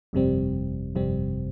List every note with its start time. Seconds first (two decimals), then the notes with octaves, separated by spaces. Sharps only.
0.13 G1 F2 C3 G3 C4
0.95 G1 F2 C3 G3 C4